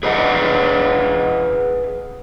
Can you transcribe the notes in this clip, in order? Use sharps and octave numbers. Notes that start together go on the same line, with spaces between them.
G#4 B4 D#5 F#5